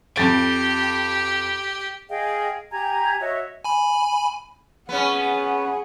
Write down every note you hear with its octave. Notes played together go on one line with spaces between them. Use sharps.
F2 G4 A6 D7
G#4 D#5 F5 G5
G4 G#5 A#5 G#6
F#4 C#5 D#5 E5
G#5 B5
B3 C#4 G#4 F#5